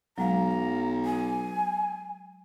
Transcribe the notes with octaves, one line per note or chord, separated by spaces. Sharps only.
B1 F#3 G#3 F5 A#5
G#5